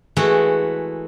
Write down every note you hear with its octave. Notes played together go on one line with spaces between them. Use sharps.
E3 G#3 A3 E4 F#4